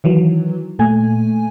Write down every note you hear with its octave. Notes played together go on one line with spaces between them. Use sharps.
D#3 E3 F#3
A#2 A3 G#5